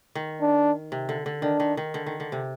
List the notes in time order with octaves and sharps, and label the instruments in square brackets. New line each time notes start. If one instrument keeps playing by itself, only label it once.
[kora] D#3
[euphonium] D4
[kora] C3
D3
D3
[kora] D#3 [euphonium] D4
[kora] D#3
D#3
D3
D#3
D3
C3